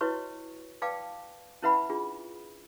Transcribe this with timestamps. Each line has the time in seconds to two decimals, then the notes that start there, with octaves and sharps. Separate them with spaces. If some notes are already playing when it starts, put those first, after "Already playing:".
0.01 E4 F#4 B4 C#5 D#5 C#6
0.82 B4 D5 F5 G5 A5 D6
1.62 C#4 E4 B4 E5 F#5 B5
1.90 D4 F4 G#4